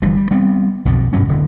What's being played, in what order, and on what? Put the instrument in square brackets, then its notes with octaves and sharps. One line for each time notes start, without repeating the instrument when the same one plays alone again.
[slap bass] G1 G2 E3 F3
G3
G3 B3 C4
B1 F2 B2 D3
G2 B2 F#3 C#4
D1 D3